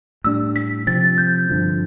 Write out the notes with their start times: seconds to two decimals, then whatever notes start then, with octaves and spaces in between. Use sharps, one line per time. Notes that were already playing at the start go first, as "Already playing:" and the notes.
0.24 A2 G3 D4 E6
0.56 B6
0.87 C3 F3 C4 A6
1.18 G6
1.49 G2 D3 F3 C4